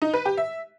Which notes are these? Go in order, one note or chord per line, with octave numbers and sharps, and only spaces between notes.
D#4
B4
G4
E5